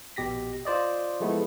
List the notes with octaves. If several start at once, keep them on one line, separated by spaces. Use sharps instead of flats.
A#1 B2 G4 A#6 B6
F4 C5 D5 D#5
F3 G#3 A3 B3 E4